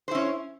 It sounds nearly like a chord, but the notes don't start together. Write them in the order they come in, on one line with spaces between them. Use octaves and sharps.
C5 E4 C#4